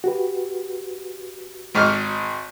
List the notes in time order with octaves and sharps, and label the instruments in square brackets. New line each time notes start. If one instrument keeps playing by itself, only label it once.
[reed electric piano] F#4 G4 B4
[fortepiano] G#1 G#2 F6